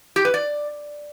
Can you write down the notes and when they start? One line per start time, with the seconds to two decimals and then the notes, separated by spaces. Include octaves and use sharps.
0.16 G4
0.25 B4
0.34 D5